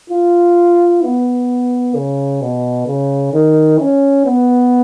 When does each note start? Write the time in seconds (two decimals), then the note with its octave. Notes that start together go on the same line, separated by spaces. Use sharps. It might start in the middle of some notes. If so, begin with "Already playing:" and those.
0.10 F4
1.03 B3
1.95 C#3
2.42 B2
2.87 C#3
3.33 D#3
3.79 C#4
4.26 B3